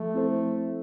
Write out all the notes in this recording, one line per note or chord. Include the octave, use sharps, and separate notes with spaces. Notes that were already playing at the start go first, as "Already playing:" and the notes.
Already playing: F3 A3
C4 E4 A4 C5
F3